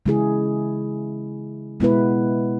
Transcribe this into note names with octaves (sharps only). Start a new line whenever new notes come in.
C#3 G#3 E4 G#4
B2 G#3 B3 E4 B4